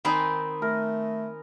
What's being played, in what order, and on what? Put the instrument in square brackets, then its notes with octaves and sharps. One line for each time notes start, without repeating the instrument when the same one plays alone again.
[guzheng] D#3 C4 D#4 [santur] D#5 G#5 B5
[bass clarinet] A3 [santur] A#4